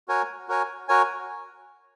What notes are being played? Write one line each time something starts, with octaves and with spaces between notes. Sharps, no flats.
F#4 A#4 C#5 G#5
F#4 A#4 C#5 G#5
F#4 A#4 C#5 G#5